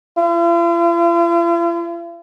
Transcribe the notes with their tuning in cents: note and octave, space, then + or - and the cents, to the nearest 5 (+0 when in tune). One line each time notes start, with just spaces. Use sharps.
F4 -45